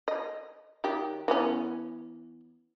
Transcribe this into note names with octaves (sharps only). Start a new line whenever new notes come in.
D#5
D#3 F#3 G4
E3 B3 C#4